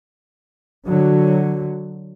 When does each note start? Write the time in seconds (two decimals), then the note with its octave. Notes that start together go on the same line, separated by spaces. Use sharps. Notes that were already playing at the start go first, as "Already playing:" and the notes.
0.85 D3 F#3